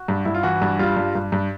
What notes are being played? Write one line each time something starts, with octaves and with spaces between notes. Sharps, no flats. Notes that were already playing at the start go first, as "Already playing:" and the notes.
Already playing: F#4
G2
G2 E4
F4
E3 F#4
G2
G3 F4
G2
G2
G2